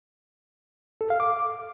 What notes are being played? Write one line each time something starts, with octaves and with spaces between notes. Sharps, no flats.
A4
F5
D6